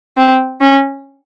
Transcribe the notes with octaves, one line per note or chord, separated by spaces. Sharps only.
C4
C#4